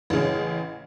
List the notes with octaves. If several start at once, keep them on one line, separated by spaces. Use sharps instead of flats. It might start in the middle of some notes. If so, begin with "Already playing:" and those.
A1 C#3